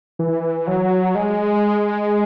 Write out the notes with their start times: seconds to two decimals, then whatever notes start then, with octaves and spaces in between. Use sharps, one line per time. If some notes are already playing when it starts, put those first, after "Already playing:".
0.19 E3
0.67 F#3
1.15 G#3